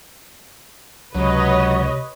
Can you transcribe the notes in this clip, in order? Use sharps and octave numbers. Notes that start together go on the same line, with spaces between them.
C#2 C3 F#3 B4 C#5 D#5